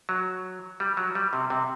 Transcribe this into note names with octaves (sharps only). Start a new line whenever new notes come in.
F#3
G3
F#3
G3
C3
C3